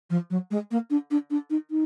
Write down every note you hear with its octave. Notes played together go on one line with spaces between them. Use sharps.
F3
F#3
G#3
A#3
D4
D4
D4
D#4
D#4